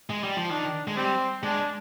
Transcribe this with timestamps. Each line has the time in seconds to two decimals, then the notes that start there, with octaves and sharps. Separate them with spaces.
0.10 G#3
0.24 G3
0.37 F3
0.50 D#3 D4
0.88 G#3
0.97 G3 C4
1.43 G#3 D4